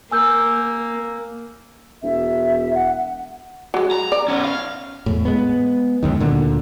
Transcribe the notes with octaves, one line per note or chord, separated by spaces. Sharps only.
A#3 G#5 E6 G6
E1 E5
F#5
F#3 G#3
A#5
D5
B3 C#4
F5
E2 A2
G#3 B3
C#2 F#2 D#3
D2 A#2 D3